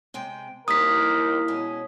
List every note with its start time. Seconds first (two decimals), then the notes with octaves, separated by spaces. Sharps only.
0.14 C3 G#3 G5
0.68 D#2 G3 A#3 E4 A#4 D#6 B6
1.48 B2 G#3 C#4